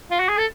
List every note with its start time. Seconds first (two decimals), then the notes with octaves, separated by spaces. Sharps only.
0.11 F4
0.20 F#4
0.29 G#4
0.38 A4